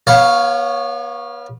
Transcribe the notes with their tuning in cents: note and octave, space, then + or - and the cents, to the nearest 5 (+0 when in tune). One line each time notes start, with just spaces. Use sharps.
B3 -35 C#5 +0 F5 +0